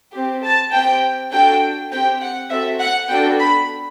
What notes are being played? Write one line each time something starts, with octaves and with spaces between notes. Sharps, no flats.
C4 G4
A5
C4 G4 G5
D4 F#4 A4 G5
C4 G4 G5
F#5
C4 F#4 A4 E5
F#5
B3 D4 F#4 A4 G5
B5